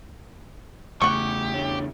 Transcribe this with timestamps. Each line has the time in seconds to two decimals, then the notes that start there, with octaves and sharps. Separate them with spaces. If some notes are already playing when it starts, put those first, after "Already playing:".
1.02 E2 C#3 A3 G4 F#5 C#6
1.54 A3 D4 C#5